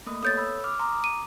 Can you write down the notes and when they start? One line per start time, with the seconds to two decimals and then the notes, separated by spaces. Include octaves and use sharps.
0.06 A3 A#3 D#6
0.23 B3 A4 C#5 D#6 G6 A6
0.37 B5 E6
0.64 D6 F6
0.80 A#5 C6 D6 D#6
1.04 D#7